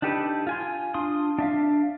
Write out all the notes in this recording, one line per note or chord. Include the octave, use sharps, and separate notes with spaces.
D4 D#4 G4 A4 B4
F4 G#5 C6
D4 F4 C6 D#6
D4 E5 F5